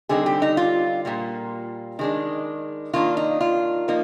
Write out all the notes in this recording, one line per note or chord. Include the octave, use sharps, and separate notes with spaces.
D3 G3 C4 D#4 G#4
G4
D#4
F4
A#2 G3 A#3
D#3 G#3 D4
D#3 A#3 D4 F4
D#4
F4
F3 A#3 D#4